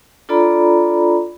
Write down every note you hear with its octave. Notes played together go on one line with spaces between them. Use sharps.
D4 F4 A4 D5 A#5 B5